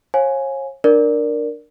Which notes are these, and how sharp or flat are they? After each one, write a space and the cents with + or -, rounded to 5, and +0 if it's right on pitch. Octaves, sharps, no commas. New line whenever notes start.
C#5 -40 F5 +15 G#5 +5
D4 +20 A#4 +0 D5 +0